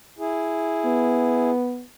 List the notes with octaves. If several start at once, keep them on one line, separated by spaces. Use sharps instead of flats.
E4 G#4
B3